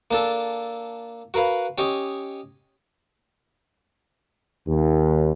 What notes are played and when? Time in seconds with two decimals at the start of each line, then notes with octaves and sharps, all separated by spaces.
0.11 A#3 D4 A4
1.34 F#4 A#4 B4 F5
1.78 C#4 G4 C#5 D#5 G#5
4.67 D#2